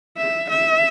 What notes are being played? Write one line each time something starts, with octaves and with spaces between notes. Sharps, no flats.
E5
E5